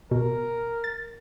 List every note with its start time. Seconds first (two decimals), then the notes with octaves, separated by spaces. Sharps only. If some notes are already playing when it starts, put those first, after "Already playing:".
0.11 B2 A#4
0.84 A6